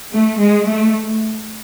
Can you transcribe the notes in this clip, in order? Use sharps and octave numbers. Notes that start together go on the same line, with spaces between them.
A3
G#3
A3